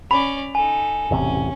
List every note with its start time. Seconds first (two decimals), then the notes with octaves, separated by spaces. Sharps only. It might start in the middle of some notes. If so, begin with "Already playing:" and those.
0.11 C#4 D5 B5 F7
0.55 D#4 A4 G#5
1.11 E1 A1 C3 C#4